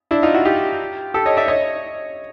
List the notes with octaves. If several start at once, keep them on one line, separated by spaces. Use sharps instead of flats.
D4 E4
D#4 F4
E4 F#4
F4 G4
G4 A4
C#5 D#5
D5 E5
C#5 D#5